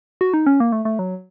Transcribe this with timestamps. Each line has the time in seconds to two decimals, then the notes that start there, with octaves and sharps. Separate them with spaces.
0.21 F#4
0.34 D#4
0.46 C#4
0.60 A#3
0.72 A3
0.85 A3
0.99 F#3